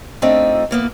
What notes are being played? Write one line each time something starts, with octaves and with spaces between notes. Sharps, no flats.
A3 C4 D4 D#4 F4 E5
E3 A#3 B3